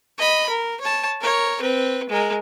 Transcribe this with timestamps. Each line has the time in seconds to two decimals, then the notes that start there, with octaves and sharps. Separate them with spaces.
0.18 D#5 B5
0.49 A#4
0.80 C#5 A5
1.21 A#4 C#5
1.61 C4 B4
2.09 G#3 A#4